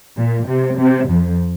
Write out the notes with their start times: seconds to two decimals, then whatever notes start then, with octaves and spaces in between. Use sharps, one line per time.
0.17 A#2
0.48 C3
0.78 C3
1.09 F2